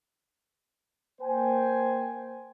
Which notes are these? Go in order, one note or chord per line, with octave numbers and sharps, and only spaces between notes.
A#3 C5 G5 G#5